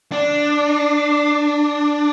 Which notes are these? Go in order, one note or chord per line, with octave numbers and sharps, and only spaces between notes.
D4